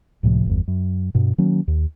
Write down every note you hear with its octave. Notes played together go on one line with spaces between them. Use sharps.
C#2 A2 C3 F3
G1 E2
F#2
G2 B2
D#3 F#3 A#3 C#4
D#2